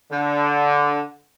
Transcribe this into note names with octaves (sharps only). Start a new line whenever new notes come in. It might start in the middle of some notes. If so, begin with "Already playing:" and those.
D3